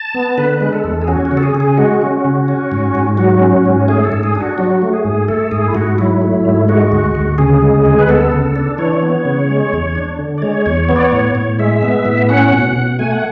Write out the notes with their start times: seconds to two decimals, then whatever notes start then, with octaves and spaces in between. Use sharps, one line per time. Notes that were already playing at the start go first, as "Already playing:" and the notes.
Already playing: A5
0.15 B3
0.38 D3 B4
0.61 G#3
0.73 A4
0.84 E2
1.02 G#4
1.07 C#4 F#4
1.25 F#4
1.31 C#3
1.37 A4
1.43 G#4
1.55 C#3
1.60 G#4
1.78 G#3 F#4
2.02 C#4
2.25 C#3
2.48 C#4
2.72 G#2
2.95 G#2
3.17 F#3 F#4
3.41 C#4
3.65 G#2
3.88 A3 G#4
4.05 A4
4.12 G#2
4.23 G#4
4.35 D4
4.41 F#4
4.58 F#3 F#4
4.82 A3
4.93 G#4
5.05 G#2
5.28 A3 A4
5.51 G#2 G#4
5.68 E4
5.75 G#2 F#4
5.98 F#3 E4
6.22 A3
6.45 G#2
6.68 G#3 F#4
6.92 D2
7.15 D2
7.38 C#3 G#4
7.62 G#3
7.86 D2
7.99 B4
8.09 B3 A4
8.32 C#3
8.56 D4
8.78 E3 C#5
9.03 B3
9.25 C#3
9.49 G#3
9.72 E2
9.95 D4
10.19 D3
10.38 D5
10.42 G#3 C#5
10.66 E2 C#5
10.89 B3 C#5
10.96 D5
11.03 C#5
11.12 A2
11.35 A2
11.59 G#3 E5
11.83 B3
12.05 A2
12.29 C#4 F#5
12.53 B2
12.76 B2
12.99 A3 G#5
13.12 F#5